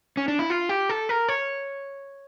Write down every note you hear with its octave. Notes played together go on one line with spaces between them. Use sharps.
C#4
D4
E4
F4
G4
A4
A#4
C#5